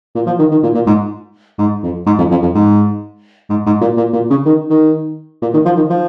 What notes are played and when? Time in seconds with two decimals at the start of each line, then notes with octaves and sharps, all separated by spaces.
0.15 A#2
0.26 F3
0.39 D#3
0.51 D#3
0.63 A#2
0.75 A#2
0.87 G#2
1.58 G#2
1.83 F2
2.06 G#2
2.18 F2
2.31 F2
2.43 F2
2.55 G#2
3.50 G#2
3.66 G#2
3.81 A#2
3.97 A#2
4.13 A#2
4.30 C#3
4.45 D#3
4.70 D#3
5.42 A#2
5.54 D#3
5.65 F3
5.77 D#3
5.90 F3